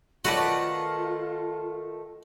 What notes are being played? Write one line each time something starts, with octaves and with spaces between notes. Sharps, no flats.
D#3 A3 F4 F#4 B4 D5 F#5